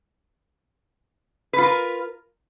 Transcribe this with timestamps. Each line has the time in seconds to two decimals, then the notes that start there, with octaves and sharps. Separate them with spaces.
1.53 B4
1.58 F4
1.63 A#4